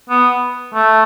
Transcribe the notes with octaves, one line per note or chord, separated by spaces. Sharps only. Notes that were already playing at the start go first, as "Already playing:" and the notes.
B3
A3